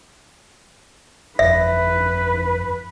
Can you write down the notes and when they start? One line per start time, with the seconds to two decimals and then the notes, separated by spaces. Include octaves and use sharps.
1.39 G1 F2 B4 E5